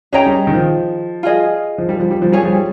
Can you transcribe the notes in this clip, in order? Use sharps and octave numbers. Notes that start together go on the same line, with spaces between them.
C#4 G#4 D#5 G5 A#5
G3
D#3
F3
F4 G#4 D#5
F3
G3
F3
G3
F3
G3 G#4 C#5 G#5
F3
G3